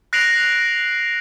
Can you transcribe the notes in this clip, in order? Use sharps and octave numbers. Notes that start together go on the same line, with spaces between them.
F#6 A#6 C7 D7 F7 F#7